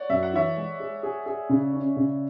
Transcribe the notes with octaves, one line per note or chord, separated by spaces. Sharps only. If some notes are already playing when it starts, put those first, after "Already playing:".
Already playing: C#5 D5 F#5
F#2 E5
F#5
E3 C#5 E5
G#3
G#4
G#4
G#4
C#3
C#4
C#3